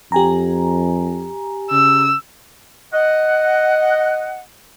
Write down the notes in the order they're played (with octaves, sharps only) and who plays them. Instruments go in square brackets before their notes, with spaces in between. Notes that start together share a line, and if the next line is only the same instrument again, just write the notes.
[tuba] F2 [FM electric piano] G4 G#5 A#5
[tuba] C#3 [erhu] E6
[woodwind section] D#5 F#5